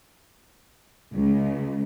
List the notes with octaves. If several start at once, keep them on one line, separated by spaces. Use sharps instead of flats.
C#2